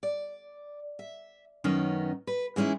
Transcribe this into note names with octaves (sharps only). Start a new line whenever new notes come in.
D5
E5
F#2 D#3 B3 C#4 D#4
B4
E3 G#3 C#4 D#4 E4